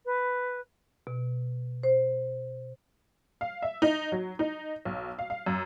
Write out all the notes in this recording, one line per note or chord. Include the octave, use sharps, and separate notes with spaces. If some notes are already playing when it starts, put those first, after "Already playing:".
B4
B2
C5
F5
E5
D#4
F#3
D#4
B1
F5
F5
F#2